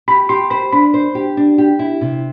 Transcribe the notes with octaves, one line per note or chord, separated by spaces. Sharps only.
G4 B5
G4 C6
C5 B5
D4 B5
C5
G4
D4
G4
E4
C3